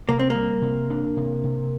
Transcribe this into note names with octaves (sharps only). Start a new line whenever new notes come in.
C3 A#3
C4
G3 A#3
C3
D4
C3
C3